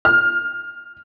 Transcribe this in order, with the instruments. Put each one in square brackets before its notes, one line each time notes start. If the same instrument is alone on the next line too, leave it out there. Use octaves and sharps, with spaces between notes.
[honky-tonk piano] F6